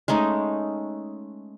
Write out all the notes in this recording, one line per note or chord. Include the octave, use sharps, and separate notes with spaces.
G#3 A3 C#4 D#4